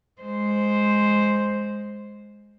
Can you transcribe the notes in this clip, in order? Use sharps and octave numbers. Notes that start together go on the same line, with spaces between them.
G#3 C5